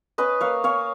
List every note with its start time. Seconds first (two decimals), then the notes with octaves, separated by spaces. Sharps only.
0.18 C#4 B4 D#5
0.41 A#3 C#5 F5
0.63 C#4 C#5 F5